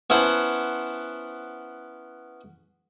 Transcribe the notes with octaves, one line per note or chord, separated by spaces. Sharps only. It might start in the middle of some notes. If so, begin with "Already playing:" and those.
B3 C#4 E4 C5 F#5 A5